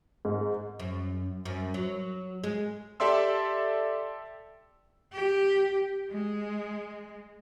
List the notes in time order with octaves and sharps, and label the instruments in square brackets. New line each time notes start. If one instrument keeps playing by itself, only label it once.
[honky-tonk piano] G#2
[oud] F#2
F#2
F#3
G#3
[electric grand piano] G4 A4 D5 E5 C6 E6
[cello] G4
G#3